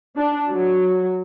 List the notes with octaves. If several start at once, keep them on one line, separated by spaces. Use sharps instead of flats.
D4
F#3